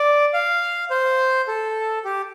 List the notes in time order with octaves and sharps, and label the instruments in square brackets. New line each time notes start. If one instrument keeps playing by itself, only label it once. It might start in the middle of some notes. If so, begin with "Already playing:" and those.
Already playing: [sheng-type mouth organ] D5
F5
C5
A4
G4